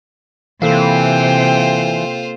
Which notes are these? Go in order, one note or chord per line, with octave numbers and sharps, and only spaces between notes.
C3 E3 A#3 F4 A4 C5 F5 G5